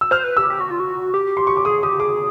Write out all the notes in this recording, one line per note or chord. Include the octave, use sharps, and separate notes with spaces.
E6
C5 F6
B4
G4 E6
G4
F#4
F4
F#4
G4
C6
C#6
D6
G#4 D#6
G4 D#6
G#4 D6